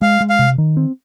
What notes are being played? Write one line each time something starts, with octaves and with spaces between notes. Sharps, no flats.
G#3 F5
G#3
F5
C3
D#3
C4